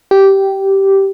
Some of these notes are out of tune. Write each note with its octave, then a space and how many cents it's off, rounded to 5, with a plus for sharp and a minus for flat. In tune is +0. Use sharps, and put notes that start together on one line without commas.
G4 -10